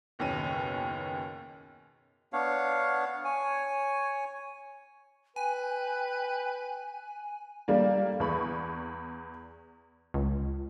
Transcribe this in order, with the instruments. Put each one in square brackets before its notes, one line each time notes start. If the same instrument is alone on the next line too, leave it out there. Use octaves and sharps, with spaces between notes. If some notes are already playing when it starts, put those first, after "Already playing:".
[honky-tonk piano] F#1 D#2 B2 C#4 D#7
[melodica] B3 D4 C#5 F5
C#5 G#5
[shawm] B4 [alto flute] G5 [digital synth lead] G#5
[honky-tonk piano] G3 A3 A#3 D4
E2 B5 C#6
[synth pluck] C#2